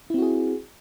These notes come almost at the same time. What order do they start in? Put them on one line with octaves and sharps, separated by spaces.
E4 C4 F#4 G#4